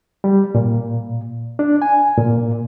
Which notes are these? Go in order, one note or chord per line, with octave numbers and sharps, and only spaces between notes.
G3
A#2
D4
G#5
A#2